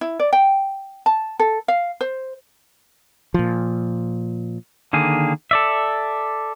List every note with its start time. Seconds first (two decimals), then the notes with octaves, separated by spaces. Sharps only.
0.01 E4
0.20 D5
0.33 G5
1.06 A5
1.40 A4
1.68 F5
2.01 C5
3.34 A#2 F3
4.93 D3 D#3 A#3 G#4
5.51 A4 D5 E5